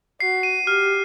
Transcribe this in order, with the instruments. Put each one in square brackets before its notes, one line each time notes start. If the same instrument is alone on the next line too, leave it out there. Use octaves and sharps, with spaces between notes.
[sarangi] F#4 [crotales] C7
[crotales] D#7
[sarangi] G4 [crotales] F6